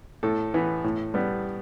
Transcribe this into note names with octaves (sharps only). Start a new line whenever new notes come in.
A2 A4
E3 B3
A2
G3 B3